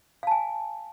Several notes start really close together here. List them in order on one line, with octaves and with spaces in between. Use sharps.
F5 A5 G#5